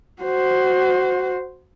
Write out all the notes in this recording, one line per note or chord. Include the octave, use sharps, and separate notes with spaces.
F#4 C5